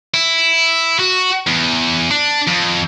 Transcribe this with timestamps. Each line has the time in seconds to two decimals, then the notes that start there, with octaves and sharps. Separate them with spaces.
0.14 E4
0.99 F#4
1.47 E2
2.11 D4
2.47 F2